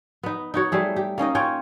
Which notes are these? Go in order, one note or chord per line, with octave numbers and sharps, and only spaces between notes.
B3 D#4
D#4 F#4 C#5
G3 A3 G#4
G4
A#3 C#4 D#4 D#5
C#4 F4 C#5 G5